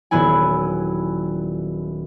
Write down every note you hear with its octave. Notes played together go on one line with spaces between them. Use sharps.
D#1 F#3 B3 E4 G#5